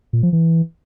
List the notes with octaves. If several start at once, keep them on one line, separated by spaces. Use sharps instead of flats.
A#2
F3
E3